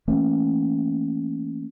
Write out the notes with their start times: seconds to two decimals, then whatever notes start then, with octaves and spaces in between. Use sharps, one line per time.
0.08 E3 A3 A#3 C#4